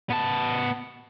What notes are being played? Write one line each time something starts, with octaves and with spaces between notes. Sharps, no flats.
B3 A5